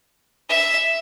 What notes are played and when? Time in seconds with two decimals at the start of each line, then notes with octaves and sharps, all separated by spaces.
0.50 E5